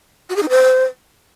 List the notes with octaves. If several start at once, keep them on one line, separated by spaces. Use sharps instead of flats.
F#4
G#4
D#4
C5